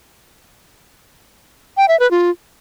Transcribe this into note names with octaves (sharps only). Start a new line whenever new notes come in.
G5
E5
B4
F4